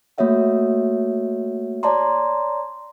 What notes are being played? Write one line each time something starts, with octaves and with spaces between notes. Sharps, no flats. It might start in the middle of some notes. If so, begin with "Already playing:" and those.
A3 A#3 F#4 C#5 E5 F#5
C#5 D5 A5 A#5 C6